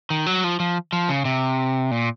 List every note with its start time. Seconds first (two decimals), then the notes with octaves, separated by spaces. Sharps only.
0.10 D#3
0.26 F#3
0.44 F3
0.60 F3
0.93 F3
1.09 C#3
1.25 C3
1.91 A#2